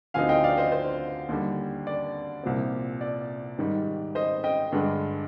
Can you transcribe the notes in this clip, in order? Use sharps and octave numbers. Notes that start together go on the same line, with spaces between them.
D2 D3 F3 C4 D#4 F5 G#5
D#5 G5
D5 F5
C5 D#5
C5
D#2 D3 G3
D5
C2 A#2 F3 C4
D5
G#2 D#3 G3
C5 D#5
D#5 G5
G2 D3 G#3 D4